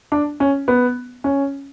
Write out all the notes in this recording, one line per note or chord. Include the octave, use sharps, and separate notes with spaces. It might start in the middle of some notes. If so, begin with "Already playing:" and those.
D4
C#4
B3
C#4